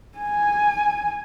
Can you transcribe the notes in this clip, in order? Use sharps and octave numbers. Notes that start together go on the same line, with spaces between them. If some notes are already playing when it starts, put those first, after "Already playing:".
G#5